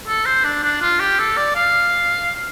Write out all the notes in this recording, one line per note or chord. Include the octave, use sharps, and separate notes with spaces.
A4
C5
D4
D4
F4
G4
A4
D5
F5